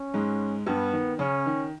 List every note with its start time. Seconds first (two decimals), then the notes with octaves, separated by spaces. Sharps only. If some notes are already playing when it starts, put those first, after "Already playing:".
Already playing: C#4
0.14 G#2 G#3
0.67 G2 G3 B3
0.93 D#3
1.19 C#3 C#4
1.46 D#3